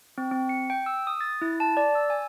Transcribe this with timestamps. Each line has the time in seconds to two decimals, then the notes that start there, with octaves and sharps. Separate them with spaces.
0.18 C4
0.31 C4
0.49 C#7
0.70 G5
0.86 E6
1.07 D#6
1.21 A6
1.41 E4
1.60 A5
1.77 D5
1.95 E6
2.10 G#5